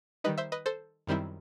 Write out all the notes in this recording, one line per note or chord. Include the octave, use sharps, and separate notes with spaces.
D#3 G3 D#4 B4 D#5
C5 E5
B4 D#5
A4 C5
F#2 D#3 G3 C4 E4